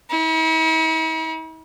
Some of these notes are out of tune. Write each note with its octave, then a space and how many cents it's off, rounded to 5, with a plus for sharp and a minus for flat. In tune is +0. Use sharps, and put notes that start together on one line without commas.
E4 -45